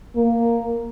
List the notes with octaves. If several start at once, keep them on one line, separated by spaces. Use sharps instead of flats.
A#3